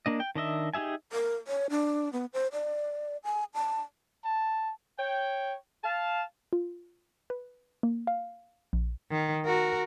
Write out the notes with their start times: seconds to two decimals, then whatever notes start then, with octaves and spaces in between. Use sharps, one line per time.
0.06 A#3 D4 D#5
0.20 G5
0.35 D#3 D4 D#5 E5
0.74 D#4 G4 G#4 E5 G#5
1.13 A#4
1.48 C#5
1.70 D4
2.13 B3
2.33 C5
2.52 D5
3.24 G#5
3.54 A5
4.25 A5
4.99 C#5 G5
5.84 F5 A5
6.53 F4
7.30 B4
7.83 A#3
8.07 F5
8.73 A#1
9.11 D#3
9.45 F#4 A#4